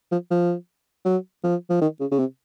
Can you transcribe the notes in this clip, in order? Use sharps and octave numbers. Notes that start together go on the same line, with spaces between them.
F3
F3
F#3
F3
F3
D#3
C#3
C#3
C3